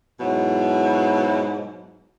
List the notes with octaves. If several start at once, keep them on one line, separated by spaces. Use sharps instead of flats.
G#2 B2 F#3 E4